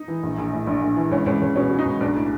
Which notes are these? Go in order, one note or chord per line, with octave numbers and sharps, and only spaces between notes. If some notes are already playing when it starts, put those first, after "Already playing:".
Already playing: D#4
E3
A#1
A#1
A2
A#1 D4
A#1
E3
C#2 C#4
C#2 C#4
C#2 C#4
B2 C#4
F#3
D#4
C#2
B1 D4
A2